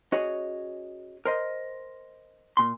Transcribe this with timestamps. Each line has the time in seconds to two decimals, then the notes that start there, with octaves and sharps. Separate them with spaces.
0.12 C#4 F#4 G#4 C#5 D#5
1.25 A#4 C5 D#5
2.57 A#2 C6